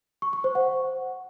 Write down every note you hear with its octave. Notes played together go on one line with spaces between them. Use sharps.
C#6
C#6
C5
F#5